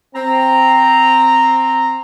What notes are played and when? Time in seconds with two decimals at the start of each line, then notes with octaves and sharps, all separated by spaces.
0.15 C4 A#5